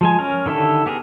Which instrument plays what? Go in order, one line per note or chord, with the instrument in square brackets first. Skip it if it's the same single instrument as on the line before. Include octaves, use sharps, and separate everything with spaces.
[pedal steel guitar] F3 G#3 G#5
C#4 A#4
D3 D#3 E4 G4 A4
B3 G4 G#4 A#4